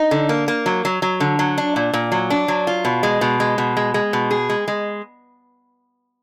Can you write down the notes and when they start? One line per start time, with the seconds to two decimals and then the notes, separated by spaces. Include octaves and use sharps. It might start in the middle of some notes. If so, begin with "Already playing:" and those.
Already playing: D#4
0.11 D3
0.29 A#3
0.48 A#3
0.66 F#3
0.85 F#3
1.02 F#3
1.20 D3
1.39 F#3
1.58 D4
1.76 A#2
1.93 A#2
2.12 F#3
2.30 D4
2.48 F#3
2.67 F4
2.85 B2
3.03 G#3
3.21 B2
3.40 G#3
3.58 B2
3.77 G#3
3.94 G#3
4.13 B2
4.31 G#4
4.49 G#3
4.68 G#3